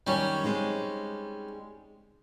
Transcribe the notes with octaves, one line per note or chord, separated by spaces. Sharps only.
D#3 F#3 G3 C#4 D#4
G#3 C4 D#4